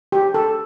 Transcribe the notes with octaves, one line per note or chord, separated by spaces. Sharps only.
G4
A4